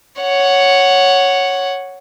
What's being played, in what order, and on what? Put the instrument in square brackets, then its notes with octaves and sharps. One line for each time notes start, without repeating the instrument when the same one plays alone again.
[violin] C#5 F#5